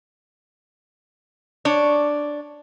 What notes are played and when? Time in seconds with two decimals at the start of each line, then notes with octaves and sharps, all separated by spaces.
1.65 D4 C#5